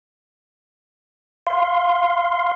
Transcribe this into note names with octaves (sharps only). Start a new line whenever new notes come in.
F5 C6